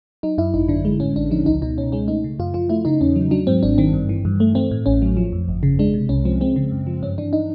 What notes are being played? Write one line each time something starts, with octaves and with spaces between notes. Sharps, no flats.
F#3 D#4
F#2 E4
G#1 D#4
D3 D4
G#3
A2 C#4
A1 D4
F3 D#4
C#2 D#4
B2 D#4
C#2 C#4
G#3 C#4
A3 D#4
C#3
F#2 F4
F3 F4
A3 E4
C#3 D#4
E2 C#4
F#3
F#3 D4
G#2 C4
G#1 D4
D#3 C4
G2
E3
G2
A3
A3 C4
A2
A1 C#4
F#3
F3
F2
G1
C#3
G#3 D4
C3
C2 C#4
F3 C4
G#3 C4
C#3
F#2
F3
G2 C#4
E3 D4
D#4